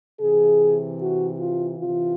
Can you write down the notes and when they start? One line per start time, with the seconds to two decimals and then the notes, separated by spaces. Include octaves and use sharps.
0.20 C3 E3 G#4
1.00 F#4
1.40 F4
1.79 C3 E3 F4